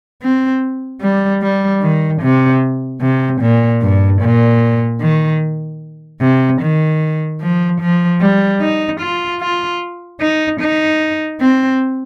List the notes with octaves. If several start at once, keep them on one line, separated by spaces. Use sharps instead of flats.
C4
G3
G3
D#3
C3
C3
A#2
G2
A#2
D#3
C3
D#3
F3
F3
G3
D#4
F4
F4
D#4
D#4
C4